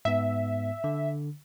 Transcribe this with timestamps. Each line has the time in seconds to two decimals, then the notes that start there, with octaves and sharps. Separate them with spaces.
0.05 G#2 B3 E5
0.84 D3